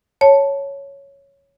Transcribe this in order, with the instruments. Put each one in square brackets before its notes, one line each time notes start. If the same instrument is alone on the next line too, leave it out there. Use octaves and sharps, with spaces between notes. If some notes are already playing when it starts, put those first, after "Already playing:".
[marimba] C#5 A5